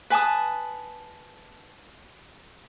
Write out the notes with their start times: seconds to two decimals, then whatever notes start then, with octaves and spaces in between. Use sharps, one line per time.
0.10 B4 G#5 A5 D#6